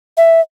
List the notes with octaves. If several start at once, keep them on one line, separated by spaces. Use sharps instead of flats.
E5